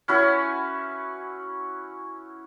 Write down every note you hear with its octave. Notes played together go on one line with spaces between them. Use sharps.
C#4 E4 F#4 B4